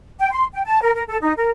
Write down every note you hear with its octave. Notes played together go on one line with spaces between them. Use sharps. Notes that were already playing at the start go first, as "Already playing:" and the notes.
G5
C6
G5
A5
A#4
A#4
A4
D#4
A#4